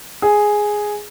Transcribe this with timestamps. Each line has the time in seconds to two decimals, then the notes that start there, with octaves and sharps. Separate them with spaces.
0.22 G#4